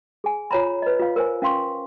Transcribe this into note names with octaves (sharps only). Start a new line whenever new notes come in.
G#4 G#5
F4 C#5 A#5 B5
B4 D#5
F4 F5
A#4 C5 G#5
C#4 F5 C6 C#6